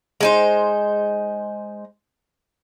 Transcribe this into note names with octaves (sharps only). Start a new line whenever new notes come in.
G#3 D#4 C5